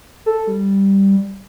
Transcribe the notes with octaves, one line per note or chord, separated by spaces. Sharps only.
A4
G3